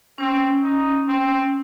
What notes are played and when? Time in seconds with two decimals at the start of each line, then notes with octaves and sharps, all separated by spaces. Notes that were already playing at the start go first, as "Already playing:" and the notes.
0.18 C4 C#4
0.63 D#4
1.08 C4